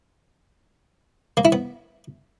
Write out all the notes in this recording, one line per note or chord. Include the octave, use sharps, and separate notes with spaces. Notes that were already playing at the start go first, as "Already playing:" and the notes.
A#3
E4
B3